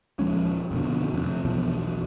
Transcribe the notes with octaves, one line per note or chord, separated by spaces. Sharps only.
D#1 F3 G#3 C#4
F2 B2 D3
F2 C3
B1 E2 B2 F3